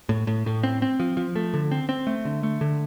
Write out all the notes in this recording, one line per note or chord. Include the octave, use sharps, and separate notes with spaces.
A2
A2
A2
C4
C4
F3
F3
A3
D3
C4
C4
A3
D3
A3
D3